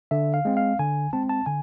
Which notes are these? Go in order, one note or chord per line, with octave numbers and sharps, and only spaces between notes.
D3 E5
F5
G#3 C4
F5
D3 G#5
G#3 C4 A5
A5
D3 G#5